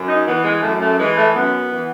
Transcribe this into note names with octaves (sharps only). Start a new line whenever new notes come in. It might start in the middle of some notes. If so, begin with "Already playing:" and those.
Already playing: F#2
D#4
E3 B3
G#3
F#2 A3
A3
E3 G#3
A3
F#2 B3
E3